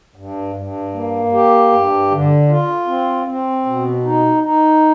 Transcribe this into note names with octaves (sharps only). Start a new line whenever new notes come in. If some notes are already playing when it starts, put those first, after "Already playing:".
G2
G2
A#3
G4
G2
D3
F4
C4
C4
B2
D#4
D#4